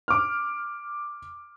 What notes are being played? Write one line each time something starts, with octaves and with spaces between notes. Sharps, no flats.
D6 F6